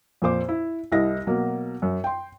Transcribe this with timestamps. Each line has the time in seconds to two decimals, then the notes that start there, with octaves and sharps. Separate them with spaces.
0.22 F2 A#2 C5 D6
0.49 E4
0.92 C2 E4 D#5 A#6
1.27 B2 F#3 A#3
1.82 F#2
2.04 G5 C6